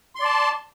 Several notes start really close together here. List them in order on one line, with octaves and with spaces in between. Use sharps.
C6 D5 A5